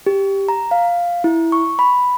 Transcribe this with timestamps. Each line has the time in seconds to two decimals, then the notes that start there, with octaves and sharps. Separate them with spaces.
0.06 G4
0.49 A#5
0.71 F5
1.24 E4
1.52 C#6
1.79 B5